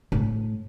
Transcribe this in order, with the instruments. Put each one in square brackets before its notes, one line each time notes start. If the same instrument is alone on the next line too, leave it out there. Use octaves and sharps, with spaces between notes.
[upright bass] A2